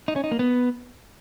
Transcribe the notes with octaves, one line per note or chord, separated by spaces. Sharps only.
D#4
C#4
D#4
A#3
B3